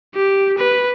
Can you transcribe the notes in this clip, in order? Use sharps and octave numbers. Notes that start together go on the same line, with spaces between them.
G4
B4